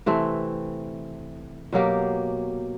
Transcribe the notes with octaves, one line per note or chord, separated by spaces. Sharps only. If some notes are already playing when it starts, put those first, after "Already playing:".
C3 E3 A3 C4
B2 F#3 A#3 G4